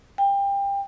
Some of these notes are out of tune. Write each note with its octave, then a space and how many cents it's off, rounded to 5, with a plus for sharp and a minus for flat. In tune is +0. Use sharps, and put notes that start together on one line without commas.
G5 +25